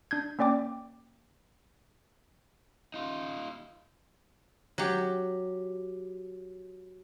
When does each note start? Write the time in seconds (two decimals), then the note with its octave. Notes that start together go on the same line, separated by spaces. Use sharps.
0.11 D4 G6 G#6
0.39 A#3 C#4 D5 G5 D6
2.94 D#4 F4
4.78 F#3 G4